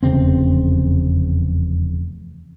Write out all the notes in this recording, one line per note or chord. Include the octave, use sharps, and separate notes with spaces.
F1 E2 C#3 C4